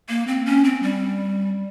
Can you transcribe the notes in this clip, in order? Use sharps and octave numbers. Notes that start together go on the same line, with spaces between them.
A#3
C4
C#4
C4
G3